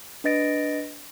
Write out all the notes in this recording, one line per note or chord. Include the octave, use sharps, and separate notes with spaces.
D4 B4 D#5 A6 A#6 D7